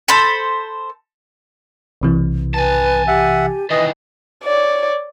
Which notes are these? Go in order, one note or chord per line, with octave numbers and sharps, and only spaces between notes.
A4 C5 B5
B1 C3 E3
B4 G#5 A5
G4 E5 F#5
D#3 E3 B4 D#5
C#5 D5